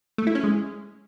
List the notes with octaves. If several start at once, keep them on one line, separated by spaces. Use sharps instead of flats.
A3
E4
C#4
G#3